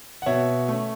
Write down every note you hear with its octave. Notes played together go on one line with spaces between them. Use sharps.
F#5
B2 C#5 E5
A3 C#4